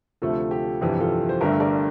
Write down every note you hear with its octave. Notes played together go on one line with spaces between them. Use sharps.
D2 C3 F3 A3 F4 A4
G4
G1 F2 C3 E3 G3 G4
F4 A4
C5
G1 G2 D3 A3 G4 A#4
A#4 D5